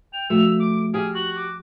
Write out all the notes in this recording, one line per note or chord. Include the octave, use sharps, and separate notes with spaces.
G5 F7
F3 A3 F#4 E6
D6 D7
G4 G#4 F6
F#4 C#6 F#7
D6